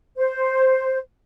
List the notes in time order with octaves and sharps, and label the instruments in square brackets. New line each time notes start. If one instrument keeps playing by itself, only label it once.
[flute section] C5